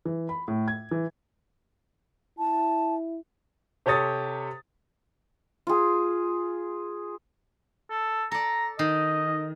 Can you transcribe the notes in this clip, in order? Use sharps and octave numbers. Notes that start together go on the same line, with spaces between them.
E3
B5
A2
G#6
E3
E4 A5
C3 G4 A4 C#5 D#6 A6
F4 G#4
A4
A4 D5 A#5
D#3 D#5